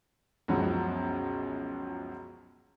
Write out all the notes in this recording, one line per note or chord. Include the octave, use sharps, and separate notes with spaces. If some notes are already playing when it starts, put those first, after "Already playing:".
C#2 F#2 B2 F3 F#3